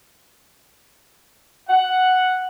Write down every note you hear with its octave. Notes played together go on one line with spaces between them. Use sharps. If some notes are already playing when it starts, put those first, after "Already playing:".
F#5